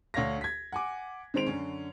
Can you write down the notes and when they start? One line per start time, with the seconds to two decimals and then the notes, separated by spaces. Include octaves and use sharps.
0.14 D2 C#5 F5 A#6
0.41 G#6 B6
0.72 F#5 G#5 D6
1.34 D#3 G#3 C4 C5 D7 F7
1.46 F#2 D3 C#4